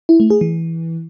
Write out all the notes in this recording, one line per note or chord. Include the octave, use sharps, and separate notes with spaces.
E4
A3
G#4
E3